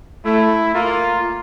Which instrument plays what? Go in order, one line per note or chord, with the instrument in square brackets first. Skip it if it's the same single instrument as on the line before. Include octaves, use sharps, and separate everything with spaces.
[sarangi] A3 [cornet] E4
[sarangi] A#3 [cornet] F4